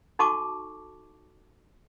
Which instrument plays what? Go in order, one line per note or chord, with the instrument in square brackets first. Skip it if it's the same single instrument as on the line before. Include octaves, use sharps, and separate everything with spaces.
[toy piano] D#4 F#4 A4 A5 C#6 D6